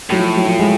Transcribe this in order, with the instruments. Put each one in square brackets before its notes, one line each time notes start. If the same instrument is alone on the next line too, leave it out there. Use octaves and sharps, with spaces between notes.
[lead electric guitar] A2 [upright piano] F#3
[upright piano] F3
F#3
F3
G#3